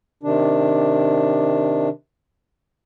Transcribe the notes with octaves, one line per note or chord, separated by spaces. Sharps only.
C3 D#3 D4